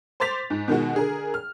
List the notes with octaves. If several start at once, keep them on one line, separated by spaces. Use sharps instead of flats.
C5 C6 D6 A6 B6 F7
G#2
B2 D#3 G#3 F#4
D3 G#4 A#4
F6